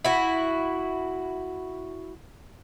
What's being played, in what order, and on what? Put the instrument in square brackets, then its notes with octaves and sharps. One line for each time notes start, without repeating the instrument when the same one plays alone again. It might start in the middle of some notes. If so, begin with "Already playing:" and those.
[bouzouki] E4 F#4